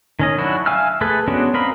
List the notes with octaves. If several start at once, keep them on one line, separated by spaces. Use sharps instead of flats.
D#3 C#4 D#5
F#3 D4 E4 F#4
E5 F5 G#5 E6 F6
A3 G#4 A4 B4
G#3 B3 C#4 D4 F#4
C4 A#4 D#5 F5 B5